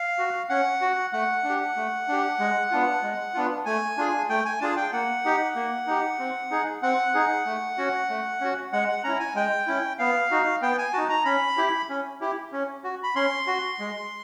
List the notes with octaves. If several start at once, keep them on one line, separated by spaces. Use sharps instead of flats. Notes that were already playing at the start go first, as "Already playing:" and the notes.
Already playing: F5
F#4
C#4 F#5
F#4
A3 F#5
D4
G4
A3
D4 G4
G#3
B3 D4 F4
G#3
B3 D4 F4
A3 G#5
D4 F4 G#4
A3 G5
G#5
D4 F4 G#4 A5
G5
A#3 F#5
D#4 G4
A#3
D#4 G4
C4
D#4 G#4
C4 F#5
D#4 G#4
A3
C#4 F#4
A3
C#4 F#4
G#3 F#5
F#5
C#4 E4 A#5
G#5
G#3 G5
C#4 E4
B3 F5
D#4 F#4
B3 G5
G#5
D#4 F#4 A5
A#5
C#4 B5
E4 G4
C#4
E4 G4
C#4
F#4
B5
C#4 C6
F#4
G#3